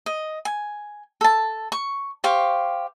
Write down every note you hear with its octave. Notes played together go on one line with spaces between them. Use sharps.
D#5
G#5
A4 A5
C#6
G4 C5 F5 C#6